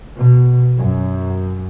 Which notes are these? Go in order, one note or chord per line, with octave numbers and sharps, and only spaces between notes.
B2
F#2